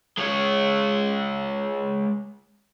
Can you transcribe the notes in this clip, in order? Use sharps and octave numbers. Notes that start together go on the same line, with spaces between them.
G#3 C#5